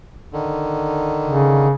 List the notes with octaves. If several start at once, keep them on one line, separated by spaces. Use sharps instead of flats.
D3 D#3
C#3